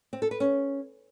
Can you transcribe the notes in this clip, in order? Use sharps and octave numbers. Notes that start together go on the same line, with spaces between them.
C4
A4
B4
C#4